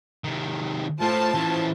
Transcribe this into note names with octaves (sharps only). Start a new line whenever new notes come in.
C3 D#3
A2 F4 C5 A5
E3 C#4